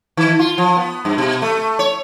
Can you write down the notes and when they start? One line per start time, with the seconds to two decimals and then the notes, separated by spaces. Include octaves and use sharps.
0.17 D#3
0.39 F4
0.58 F3
0.77 B3
1.05 G2
1.18 B2
1.42 A3
1.79 C#5